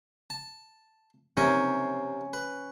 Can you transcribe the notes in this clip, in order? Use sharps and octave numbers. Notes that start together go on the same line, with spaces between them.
A5
C3 C4 C#4 A#4
B4